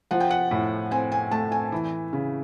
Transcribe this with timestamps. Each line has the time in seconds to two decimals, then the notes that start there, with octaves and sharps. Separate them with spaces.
0.11 F3 F#5
0.20 G5
0.31 F#5
0.51 A2
0.91 C4 G#5
1.12 G#5
1.31 A3 A5
1.52 G#5
1.72 E3
2.13 C#3